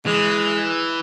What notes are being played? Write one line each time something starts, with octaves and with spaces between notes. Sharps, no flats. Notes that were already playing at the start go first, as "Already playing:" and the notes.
E3 G#3